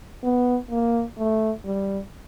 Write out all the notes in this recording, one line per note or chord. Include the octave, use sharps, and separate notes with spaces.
B3
A#3
A3
G3